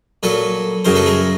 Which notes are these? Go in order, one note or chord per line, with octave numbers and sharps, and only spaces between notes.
A#2 F#3 A4 B4
F#2 C#3 F#3 A#4 C5
A4 B4
G#4 A#4